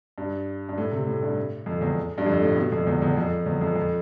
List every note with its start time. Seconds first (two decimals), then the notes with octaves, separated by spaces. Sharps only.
0.18 G2
0.69 G2
0.78 A2
0.91 C3
1.07 A2
1.22 G2
1.66 F2
1.81 E2
2.18 G2
2.26 F2
2.42 A2
2.57 B2
2.72 F2
2.87 E2
3.02 E2
3.17 F2
3.46 E2
3.61 F2
3.76 F2